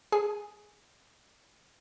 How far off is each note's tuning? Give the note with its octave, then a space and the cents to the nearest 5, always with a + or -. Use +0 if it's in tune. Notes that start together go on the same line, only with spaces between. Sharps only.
G#4 +0 G#5 +0